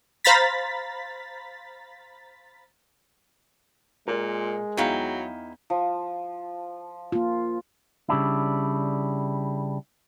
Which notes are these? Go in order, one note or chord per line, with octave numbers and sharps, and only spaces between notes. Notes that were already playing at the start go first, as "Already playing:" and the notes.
C5 F5 A#5 B5 A6 B6
A#2 G#3 A#4
E2 F#3 D#4 E4 F5 G5
F3
A#3 F4
C#3 G3 D4 E4